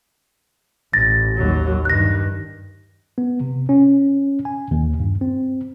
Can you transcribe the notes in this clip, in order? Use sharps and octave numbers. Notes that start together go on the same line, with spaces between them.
A1 A6 A#6
D#2 F#3
G2 D#3 F#6 A#6
B3
C3
C#4
G#5
D#2
G2
C4